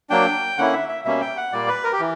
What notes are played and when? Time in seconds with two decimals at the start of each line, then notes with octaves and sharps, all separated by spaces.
0.10 F#3 A#3 D4 G5
0.58 D3 A#3 C#4 E4 F#5
0.73 E5
0.88 E5
1.05 B2 G3 A#3 C#4 E5
1.21 G5
1.37 F#5
1.53 A#2 G3 A#3 D5
1.68 B4
1.84 A#4
1.92 G4
2.00 E3